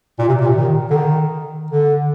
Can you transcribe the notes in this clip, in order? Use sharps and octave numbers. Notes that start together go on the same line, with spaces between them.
A#2
C3
A#2
C3
D#3
D3
D#3
D3